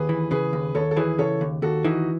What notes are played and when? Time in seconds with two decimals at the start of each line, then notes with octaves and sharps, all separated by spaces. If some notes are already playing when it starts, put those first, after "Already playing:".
Already playing: D#2 G#4 B4
0.09 E3
0.31 C#3 G#4 B4
0.53 D#2
0.75 D#2 A4 C#5
0.91 A4
0.96 E3 G#4 B4
1.19 C#3 A4 C#5
1.41 D#2
1.62 D#2 F#4 A4
1.85 E3 D#4 F#4